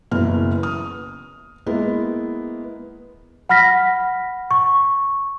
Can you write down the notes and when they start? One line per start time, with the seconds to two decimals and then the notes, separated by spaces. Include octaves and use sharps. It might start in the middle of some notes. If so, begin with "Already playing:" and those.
0.11 F#1 B2 E3 F6
0.63 D#6 F6
1.67 G#3 A#3 B3 E4
3.49 F#5 B5 F6 A#6 B6
4.51 C#6